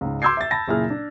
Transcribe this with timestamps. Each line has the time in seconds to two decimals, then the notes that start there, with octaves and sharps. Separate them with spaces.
0.01 C#2 G#2
0.22 C6 D6 E6 G6 G#6 C7
0.37 E5 A6
0.51 A5 B5 A6 A#6
0.68 F#1 A#2 E4 G#4 F6
0.90 D4